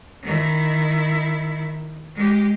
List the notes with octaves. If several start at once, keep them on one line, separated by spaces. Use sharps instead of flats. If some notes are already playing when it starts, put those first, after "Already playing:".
D#3 E4
G#3 G4